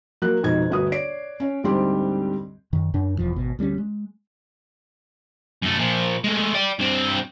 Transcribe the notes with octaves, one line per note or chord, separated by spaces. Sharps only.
F#3 A#3 F#6
F2 G#2 B2 D#4 G#6
G1 D2 F#4 B4 D#6
C#5 D5 C7 D7
C#4 C#5
D2 G#2 G3 C4 G4 C6
F#2 D#3
F#2 C#3 D4
E1 E2 F3
G#1 B2
D2 G3 A#3 C#4
G#3
F#2 A3
A#2 F3
G#3 A3
D5 G5
G2 C4